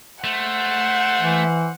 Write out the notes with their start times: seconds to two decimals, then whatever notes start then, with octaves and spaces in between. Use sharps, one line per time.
0.24 A3 C5 F#5
1.22 E3